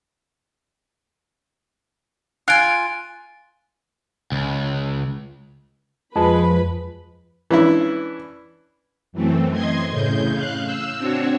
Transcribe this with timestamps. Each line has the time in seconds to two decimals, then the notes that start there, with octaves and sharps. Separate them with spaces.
2.48 F4 G#5 F#6 D7
4.32 C#2
6.16 F2 F3 G#3 B4 B5
7.51 E3 C#4 D4 E4
9.13 F#2 E3 A3 C4
9.52 D#5 C6 G#6
9.91 A2 C#3 G6
10.33 F5 F#6
10.65 E6
10.97 C4 D4 F#4 C#5